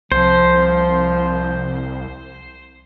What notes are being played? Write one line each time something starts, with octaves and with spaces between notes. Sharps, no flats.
C2 F3 C5